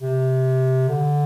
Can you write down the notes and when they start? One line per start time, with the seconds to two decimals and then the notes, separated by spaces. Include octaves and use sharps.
0.01 C3
0.88 D3